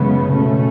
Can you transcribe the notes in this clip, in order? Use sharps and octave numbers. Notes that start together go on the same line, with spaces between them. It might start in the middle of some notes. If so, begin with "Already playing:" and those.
Already playing: F#2 C#3 E3 G#3 B3
B2 A3 C#4